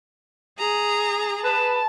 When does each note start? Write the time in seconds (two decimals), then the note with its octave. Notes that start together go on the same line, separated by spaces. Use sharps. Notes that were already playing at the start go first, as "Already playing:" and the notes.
0.59 G#4 A#5
1.44 B4 A5